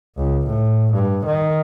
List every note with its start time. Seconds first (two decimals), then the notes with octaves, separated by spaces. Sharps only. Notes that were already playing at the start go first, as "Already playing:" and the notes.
0.17 C#2
0.47 A2
0.94 G2
1.26 D#3